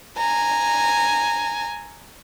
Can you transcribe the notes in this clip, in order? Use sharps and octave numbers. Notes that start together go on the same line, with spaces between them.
G#5 A#5